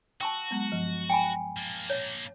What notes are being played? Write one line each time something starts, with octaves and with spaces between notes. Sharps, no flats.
F#4 G5 A5 C#6 E6
F#3 G#3 B3
G2 F3
G5 G#5 B5
A#3 D4
C#5